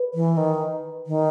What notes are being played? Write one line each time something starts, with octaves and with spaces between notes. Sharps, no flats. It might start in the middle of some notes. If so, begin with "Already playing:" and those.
Already playing: B4
E3
D#3
D#3